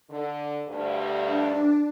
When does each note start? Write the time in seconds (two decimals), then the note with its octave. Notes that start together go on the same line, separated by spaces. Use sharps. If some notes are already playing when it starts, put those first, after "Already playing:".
0.10 D3
0.68 D2 G2
1.25 D4